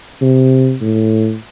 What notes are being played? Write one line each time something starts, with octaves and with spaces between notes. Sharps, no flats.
C3
A2